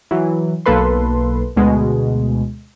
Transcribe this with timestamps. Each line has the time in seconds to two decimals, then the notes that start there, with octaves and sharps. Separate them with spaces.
0.11 E3 F#3
0.66 B1 A#3 A4 B4 C6
1.56 D2 B2 G#3